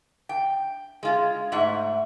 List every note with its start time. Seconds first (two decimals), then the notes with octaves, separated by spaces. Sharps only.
0.29 G5
1.03 G#3 F4
1.52 G#2 A3 E5 F#5